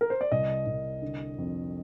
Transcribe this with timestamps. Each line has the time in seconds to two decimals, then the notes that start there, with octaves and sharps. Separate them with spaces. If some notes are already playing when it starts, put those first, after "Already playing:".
0.01 A#4
0.10 C5
0.21 D5
0.32 C2 D#5
0.66 C2
1.02 D3
1.38 F2